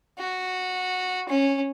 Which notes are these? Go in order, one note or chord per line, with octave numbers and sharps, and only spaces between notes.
F#4
C#4